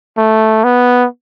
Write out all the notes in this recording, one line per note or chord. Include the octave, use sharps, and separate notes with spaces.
A3
B3